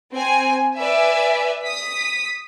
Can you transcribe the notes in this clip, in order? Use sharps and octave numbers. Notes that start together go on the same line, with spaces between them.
C4 G#5
B4 D5 E5 G#5
D#6 B6